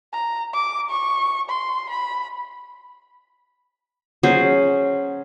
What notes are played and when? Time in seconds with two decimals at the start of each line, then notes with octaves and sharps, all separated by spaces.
0.12 A#5
0.53 D6
0.89 C#6
1.50 C6
1.89 B5
4.23 F#3 C#4 G#4 C5